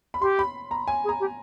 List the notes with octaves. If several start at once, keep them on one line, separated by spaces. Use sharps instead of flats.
B5
G4 C6
B5
A#5
G#5
G#4
A#5
G4